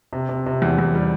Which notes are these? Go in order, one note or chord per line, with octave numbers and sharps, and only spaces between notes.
C3
C3
C3
E2
E2
G3